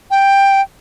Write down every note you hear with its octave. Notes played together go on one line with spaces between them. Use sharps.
G5